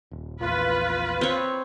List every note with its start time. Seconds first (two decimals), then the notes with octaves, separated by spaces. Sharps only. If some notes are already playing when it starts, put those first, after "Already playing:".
0.11 D#1
0.40 A#1 E2 F4 B4
1.21 C4 C#5